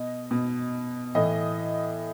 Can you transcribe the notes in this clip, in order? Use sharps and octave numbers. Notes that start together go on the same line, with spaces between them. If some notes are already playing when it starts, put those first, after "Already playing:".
Already playing: B2 D#5
B2
A2 E3 D#5